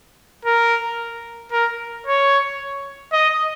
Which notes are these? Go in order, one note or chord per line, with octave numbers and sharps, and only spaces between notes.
A#4
A#4
C#5
D#5